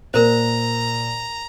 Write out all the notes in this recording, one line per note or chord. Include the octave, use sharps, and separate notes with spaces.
A#2 A#4 C5 A#5